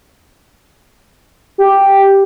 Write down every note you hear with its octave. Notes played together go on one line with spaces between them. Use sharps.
G4